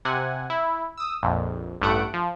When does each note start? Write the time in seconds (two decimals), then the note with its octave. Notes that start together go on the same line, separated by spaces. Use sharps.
0.05 C3 F#5 G#5
0.50 E4
0.98 D#6 E6
1.23 A#1 F2
1.81 A1 G2 A3 F#5 D7
2.14 F3